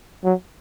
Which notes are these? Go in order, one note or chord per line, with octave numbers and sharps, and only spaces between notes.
F#3